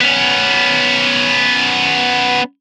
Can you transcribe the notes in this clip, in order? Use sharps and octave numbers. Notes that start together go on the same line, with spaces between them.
B3 C#4